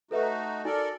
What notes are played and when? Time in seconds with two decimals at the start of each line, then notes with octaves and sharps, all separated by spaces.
0.11 A3 D#4 F#4 A4 B4 E5
0.23 A#5
0.65 D#4 F#4 A4 A#4 D5 G#5